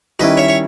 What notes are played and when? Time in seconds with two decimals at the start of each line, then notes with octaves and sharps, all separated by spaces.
0.19 D#3 G3 C#4 E4 B4 D#5
0.37 C#5 E5
0.48 C#5